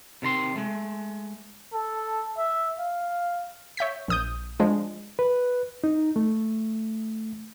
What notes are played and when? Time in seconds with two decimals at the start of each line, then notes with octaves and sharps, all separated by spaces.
0.22 C3 D#3 A#5 C6
0.56 G#3 A3
1.73 A4
2.37 E5
2.79 F5
3.77 C#5 E5 G6 B6
4.08 A#1 D#6 G6
4.60 F3 G#3 D4
5.19 B4
5.84 D#4
6.16 A3